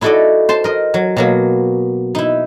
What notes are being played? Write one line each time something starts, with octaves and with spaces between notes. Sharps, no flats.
D#4 E4 F#4 A4 D5 D#5
C5 A5 C6
A#4 D#5
F#3
B2 F#3 A#3
D#4 E4